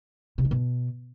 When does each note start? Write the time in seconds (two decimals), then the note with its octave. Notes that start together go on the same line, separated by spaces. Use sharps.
0.38 C3
0.45 D#3
0.51 B2